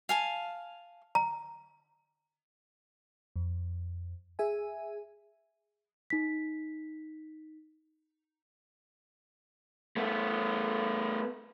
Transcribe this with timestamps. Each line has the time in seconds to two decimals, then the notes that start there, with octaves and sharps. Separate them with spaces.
0.09 F5 G#5 A5
1.15 A#5
3.36 F2
4.39 G#4 E5 G#5
6.10 D#4 B6
9.97 A3 B3